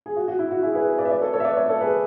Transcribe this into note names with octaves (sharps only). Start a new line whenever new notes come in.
G#4
F#4
F#4
E4
F#4
E4 G#4
G#4 B4
B4 D5
E5
B4 D5
A4 C#5
A4 C#5
E5
B4 D5
C#5 E5
A4 C#5
G#4 B4